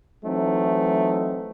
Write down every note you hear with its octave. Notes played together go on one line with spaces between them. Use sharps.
E3 F#3 A3 C4 D#4